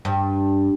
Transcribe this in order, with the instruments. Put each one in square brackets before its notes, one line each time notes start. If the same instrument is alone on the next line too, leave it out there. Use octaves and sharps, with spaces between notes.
[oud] G2